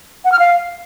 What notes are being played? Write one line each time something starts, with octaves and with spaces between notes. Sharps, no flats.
F#5
F6
F5